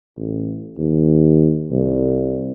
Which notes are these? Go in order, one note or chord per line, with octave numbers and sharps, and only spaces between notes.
A1
D#2
C2